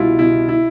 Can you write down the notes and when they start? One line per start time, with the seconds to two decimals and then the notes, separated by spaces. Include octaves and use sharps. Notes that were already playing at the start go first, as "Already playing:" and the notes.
Already playing: C2 B2 E4 F4
0.19 B2 E4
0.49 E4